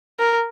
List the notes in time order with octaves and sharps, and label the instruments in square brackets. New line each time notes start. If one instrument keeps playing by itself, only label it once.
[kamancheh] A#4